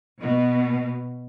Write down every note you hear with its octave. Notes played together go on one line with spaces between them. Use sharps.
B2